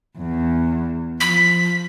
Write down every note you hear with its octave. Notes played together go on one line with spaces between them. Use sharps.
E2
F3 B6